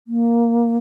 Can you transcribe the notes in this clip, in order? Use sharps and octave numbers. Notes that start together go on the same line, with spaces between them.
A#3